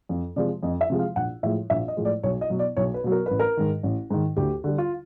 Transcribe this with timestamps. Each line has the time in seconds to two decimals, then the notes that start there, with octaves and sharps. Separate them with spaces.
0.09 F2
0.36 C3 F3 G#3 D5
0.63 F2 D#5
0.81 E5
0.90 C3 F3 G#3
0.99 F5
1.16 A#1 F#5
1.43 A2 F3 G#3 E5
1.70 A#1 E5
1.88 D#5
1.97 A2 F3 G#3
2.05 D5
2.23 B1 C#5
2.41 D#5
2.50 B2 F#3
2.59 D5
2.77 B1 C#5
2.94 B4
3.04 B2 F#3
3.12 A#4
3.26 A1 B4
3.40 A#4
3.57 G#2 D#3
3.83 A1
4.10 G#2 D#3
4.37 D2 G4
4.64 D3 G3
4.78 F4